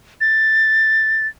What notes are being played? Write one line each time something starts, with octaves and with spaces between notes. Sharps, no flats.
A6